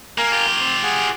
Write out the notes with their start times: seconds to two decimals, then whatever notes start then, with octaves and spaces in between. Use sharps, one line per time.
0.18 A#3 A#4 F5 G#5
0.32 F4 G4
0.60 C4
0.83 G#4 F#5 G#5